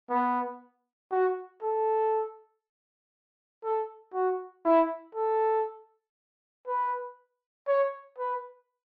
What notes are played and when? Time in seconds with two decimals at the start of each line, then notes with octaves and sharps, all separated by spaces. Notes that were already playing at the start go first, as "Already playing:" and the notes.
0.10 B3
1.12 F#4
1.62 A4
3.64 A4
4.14 F#4
4.65 E4
5.15 A4
6.68 B4
7.68 C#5
8.19 B4